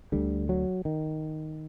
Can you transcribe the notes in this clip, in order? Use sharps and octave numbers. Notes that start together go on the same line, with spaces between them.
D2 D3 G3
F#3
D#3